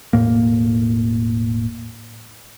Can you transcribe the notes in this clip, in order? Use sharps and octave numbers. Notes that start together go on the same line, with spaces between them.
E1 A2 A#3